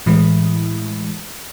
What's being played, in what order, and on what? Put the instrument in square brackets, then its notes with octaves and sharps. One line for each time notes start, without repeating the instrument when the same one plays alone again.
[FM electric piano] A2 E3 G#3 E4